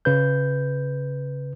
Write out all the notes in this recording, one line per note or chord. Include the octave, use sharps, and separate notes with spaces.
C#3 B4 G6